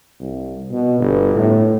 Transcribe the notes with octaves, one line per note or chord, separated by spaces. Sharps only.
C2
B2
G1
A2